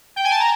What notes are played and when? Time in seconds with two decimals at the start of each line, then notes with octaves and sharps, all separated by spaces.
0.16 G5
0.25 G#5
0.31 A5
0.40 A#5